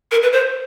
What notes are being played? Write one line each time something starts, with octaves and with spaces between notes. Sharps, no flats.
A#4
B4
C5